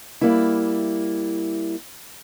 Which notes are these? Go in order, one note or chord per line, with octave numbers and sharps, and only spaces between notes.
G3 A#3 E4